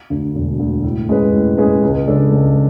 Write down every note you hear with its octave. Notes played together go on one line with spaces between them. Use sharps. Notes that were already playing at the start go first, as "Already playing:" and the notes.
D2 D3
E1
D2 D3
A2
G#3 C#4 G#4 B4
A2
G#3 C#4 G#4 B4
C#2
C#3 G#3 D4 A4
C#2